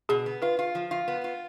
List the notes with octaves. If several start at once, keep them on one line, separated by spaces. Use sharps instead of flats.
B2 G#4
B3
F4 B4
F4
F3
F4
B3
F4